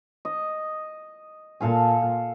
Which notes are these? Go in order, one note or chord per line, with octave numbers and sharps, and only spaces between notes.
D#5
A#2 A4 F5 G#5